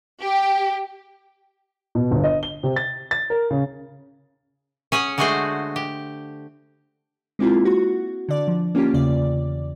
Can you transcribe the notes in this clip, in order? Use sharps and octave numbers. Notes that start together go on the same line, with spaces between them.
G4
B2
G1
D#5
G7
C3
A6
A6
A#4
C#3
C#4 G#4 C#5 F#5
D3 G#3 A3 F#4 G#4 C5
G4
G#3 A#3 C4 E4 F4
F#4
D3 D5
F3
A#3 C#4 F4 G4
E2 C#3 D5